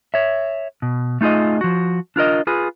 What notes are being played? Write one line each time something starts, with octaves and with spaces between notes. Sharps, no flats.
C#5 E5
B2
A3 D#4 F4 G#4 D#5
F3 F#4
D4 F4 A#4 D#5
F4 G#4 B4